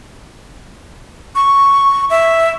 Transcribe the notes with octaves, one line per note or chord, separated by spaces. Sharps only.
C#6
E5